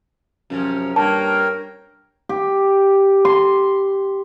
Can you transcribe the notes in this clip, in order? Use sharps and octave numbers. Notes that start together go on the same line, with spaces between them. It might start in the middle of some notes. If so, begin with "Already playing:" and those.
F#2 C3 F3 C#4
G2 A#3 A#4 C#5 G5 A5
G4
C6